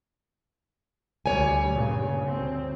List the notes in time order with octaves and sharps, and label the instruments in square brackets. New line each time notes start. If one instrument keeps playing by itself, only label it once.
[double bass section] D2 G3 [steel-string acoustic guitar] C#5 G#5
[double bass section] G2 A#2 C#3
D2 C4